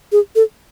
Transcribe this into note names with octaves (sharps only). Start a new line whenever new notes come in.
G#4
A4